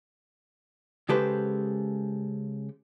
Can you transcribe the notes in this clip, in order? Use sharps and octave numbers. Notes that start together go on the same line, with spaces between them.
C#3 G#3 G4 A4 B4 C5